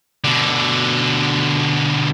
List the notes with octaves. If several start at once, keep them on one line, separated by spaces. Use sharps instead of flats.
B2 D3